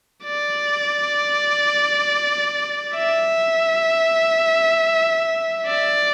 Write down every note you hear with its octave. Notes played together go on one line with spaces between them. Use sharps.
D5
E5
D5